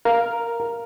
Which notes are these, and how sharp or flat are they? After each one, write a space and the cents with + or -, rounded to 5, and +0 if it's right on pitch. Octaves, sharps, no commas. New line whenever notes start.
A#4 +0 F5 -5